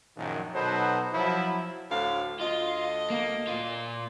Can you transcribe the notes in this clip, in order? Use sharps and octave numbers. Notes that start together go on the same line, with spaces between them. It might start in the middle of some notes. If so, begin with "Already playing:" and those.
A#1 F#2 A#2 D#3
B2 F#3 D#4 A4 B4 C5
F3 F#3 E4
D2 A2 F5
D2 F4 D#5
A#3
A#2 F4